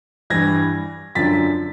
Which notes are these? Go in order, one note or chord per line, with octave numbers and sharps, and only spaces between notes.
G2 E3 G#6 A#6
F#2 D3 F3 A6 B6